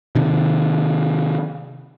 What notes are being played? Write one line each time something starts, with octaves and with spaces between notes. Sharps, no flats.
C3 D#3